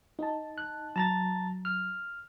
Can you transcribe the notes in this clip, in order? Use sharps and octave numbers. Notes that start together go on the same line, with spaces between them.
D#4 A5
F#6
F#3 A5 A#5 A6
F6